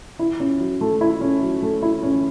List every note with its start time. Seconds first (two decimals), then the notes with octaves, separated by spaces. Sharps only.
0.19 E4
0.40 C#4
0.60 F#3
0.81 A3
1.01 E4
1.21 C#4
1.42 F#3
1.62 A3
1.82 E4
2.03 C#4